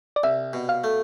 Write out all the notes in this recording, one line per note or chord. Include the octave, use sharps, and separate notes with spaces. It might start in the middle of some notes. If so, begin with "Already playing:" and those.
D5
C2 E5
B2
F5
A3